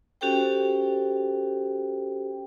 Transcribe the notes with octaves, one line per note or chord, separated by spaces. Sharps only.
C#4 F#4 G4 A4 C5 G5